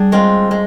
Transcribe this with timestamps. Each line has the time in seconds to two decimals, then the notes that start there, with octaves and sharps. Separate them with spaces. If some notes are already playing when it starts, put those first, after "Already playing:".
Already playing: G3 D4 G#4
0.12 G#3 C4 F4
0.51 G#3